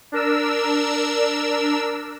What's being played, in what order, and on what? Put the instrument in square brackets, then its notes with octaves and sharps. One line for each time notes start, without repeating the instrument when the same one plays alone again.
[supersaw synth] D4 A#4 E6